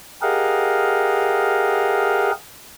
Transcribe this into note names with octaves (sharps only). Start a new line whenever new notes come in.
G4 G#4 A#4 D#5 F5 F#5